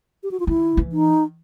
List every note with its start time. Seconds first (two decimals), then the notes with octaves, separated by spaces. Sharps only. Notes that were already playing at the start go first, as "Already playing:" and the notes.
0.23 G4
0.31 F#4
0.40 F4
0.47 D#3 E4
0.77 E3
0.92 D#4